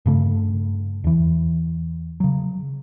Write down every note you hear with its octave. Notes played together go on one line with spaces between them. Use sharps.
G2 C#3 A3
E2 E3
C#3 F#3